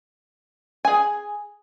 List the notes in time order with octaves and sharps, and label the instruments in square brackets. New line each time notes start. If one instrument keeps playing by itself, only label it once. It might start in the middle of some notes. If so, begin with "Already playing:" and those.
[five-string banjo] G#4 G#5